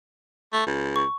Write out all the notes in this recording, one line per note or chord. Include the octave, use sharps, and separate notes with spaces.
A3
C#2
C#6